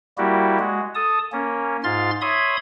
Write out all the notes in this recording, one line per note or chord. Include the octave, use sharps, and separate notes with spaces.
G3 A#3 E4 F#4 G4
G#3 F#4
A4 A5 D#6
A#3 C#4
G#2 F4 C6 F6 A6
C#5 E5 B5 C6 D#6 G#6